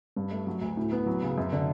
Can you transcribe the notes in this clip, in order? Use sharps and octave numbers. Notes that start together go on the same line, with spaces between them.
G2
A3
F#3
D2
A2
B3
F#3
C#3
F#2
D3